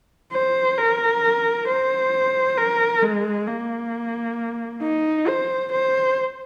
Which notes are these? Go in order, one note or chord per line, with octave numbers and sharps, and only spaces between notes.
C5
A#4
C5
A#4
G#3
A#3
D#4
C5
C5